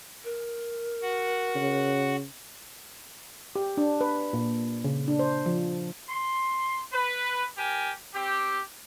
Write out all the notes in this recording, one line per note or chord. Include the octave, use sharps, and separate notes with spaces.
A#4
F#4 F#5
C#3
G4
D4
B4
A#2
C#3
D4
C5
F3
C6
B4
G4 A#4 G#5
C4 G4